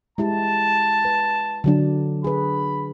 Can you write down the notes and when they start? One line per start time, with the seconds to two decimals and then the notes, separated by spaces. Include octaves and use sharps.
0.18 G#3 E4 G4 A5
1.05 B4
1.64 D3 F#3 D4
2.24 G#4 B4 B5